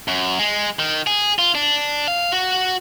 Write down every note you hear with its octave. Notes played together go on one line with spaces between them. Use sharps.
F#2
G#3
D#3
G#4
F4
D4
F5
F#4